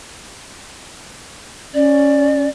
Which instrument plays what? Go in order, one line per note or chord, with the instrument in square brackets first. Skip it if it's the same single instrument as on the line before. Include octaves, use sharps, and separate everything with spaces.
[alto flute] C#4 [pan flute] D5